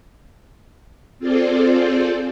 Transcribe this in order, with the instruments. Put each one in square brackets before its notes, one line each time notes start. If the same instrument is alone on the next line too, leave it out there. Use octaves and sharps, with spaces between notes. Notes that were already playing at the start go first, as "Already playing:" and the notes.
[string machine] C4 F4 G#4 A4 C5 D5